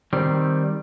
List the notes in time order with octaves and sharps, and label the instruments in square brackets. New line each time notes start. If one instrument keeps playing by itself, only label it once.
[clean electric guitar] D#3 G3 C4